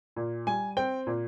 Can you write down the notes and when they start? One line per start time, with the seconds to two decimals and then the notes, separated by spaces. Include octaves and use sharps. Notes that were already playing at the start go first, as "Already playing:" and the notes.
0.16 A#2
0.47 G3 G#5
0.77 C4 G5
1.07 A#2